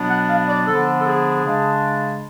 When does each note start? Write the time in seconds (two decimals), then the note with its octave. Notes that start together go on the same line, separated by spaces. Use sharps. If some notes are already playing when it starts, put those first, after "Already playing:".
Already playing: B2 F#3 B3 D4
0.08 F#5
0.28 F5
0.47 D5
0.67 D3 F3 B3 D4 A4
0.99 A4
1.05 G#4
1.45 C#3 G#3 D4